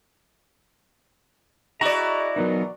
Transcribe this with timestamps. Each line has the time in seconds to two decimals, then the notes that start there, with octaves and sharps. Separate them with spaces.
1.81 E4 F#4 G#4 D5 D#5 A#5
2.36 B2 E3 F#3 B3 D#4 A#4